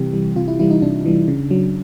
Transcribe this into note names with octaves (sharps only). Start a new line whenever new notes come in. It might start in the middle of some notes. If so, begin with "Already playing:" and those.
Already playing: C3 E3 G3 G4
E3 G3
C3 F4
E4
E3 G3 E4
D#4
C3 D4
E3 G3
C#3
F#3